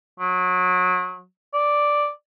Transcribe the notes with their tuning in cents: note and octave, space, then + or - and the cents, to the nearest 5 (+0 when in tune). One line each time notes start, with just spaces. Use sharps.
F#3 -30
D5 +0